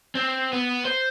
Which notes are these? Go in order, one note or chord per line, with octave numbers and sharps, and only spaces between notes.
C4
B3
C5